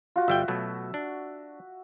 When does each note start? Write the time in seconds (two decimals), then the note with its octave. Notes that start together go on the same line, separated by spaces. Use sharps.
0.16 F4 F#4
0.28 G1 G3 E5 G5
0.48 B2 F#3 A3
0.94 D4